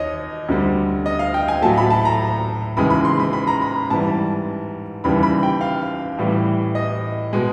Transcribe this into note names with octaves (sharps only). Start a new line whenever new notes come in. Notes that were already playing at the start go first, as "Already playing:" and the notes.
Already playing: D#2 D#3 C#5 D#5
D2 D3 G3
D#5
F5
G5
G#5
A2 F#3 A3 A5
B5
A5
A#5
D#2 C#3 E3 G#3 B5
B5
C6
B5
B5
A#5
B5
G#2 E3 G3 A5
D#2 C#3 E3 G3 B5
B5
G5
F5
A2 E3 G3
D#5
B2 G#3